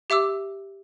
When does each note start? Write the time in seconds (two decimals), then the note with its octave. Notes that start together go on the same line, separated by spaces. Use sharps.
0.10 G4 E5 D6 E6